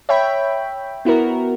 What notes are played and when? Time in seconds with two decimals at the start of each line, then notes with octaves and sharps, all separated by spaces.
0.09 C#5 E5 G5 B5
1.05 B3 E4 F#4 A#4